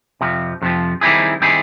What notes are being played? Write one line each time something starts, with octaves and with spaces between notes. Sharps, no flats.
F2 C3 F3
F2 C3 F3
D#3 G3 C4 E4 G#4
D#3 G3 C4 E4 G#4